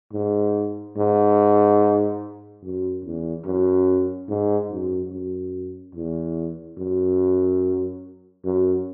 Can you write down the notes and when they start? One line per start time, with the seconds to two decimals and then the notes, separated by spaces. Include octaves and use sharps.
0.13 G#2
0.97 G#2
2.63 F#2
3.05 E2
3.45 F#2
4.29 G#2
4.71 F#2
5.12 F#2
5.95 E2
6.78 F#2
8.44 F#2